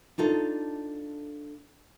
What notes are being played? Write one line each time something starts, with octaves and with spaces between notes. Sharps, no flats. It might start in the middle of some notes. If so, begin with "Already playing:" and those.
D4 D#4 F4 A4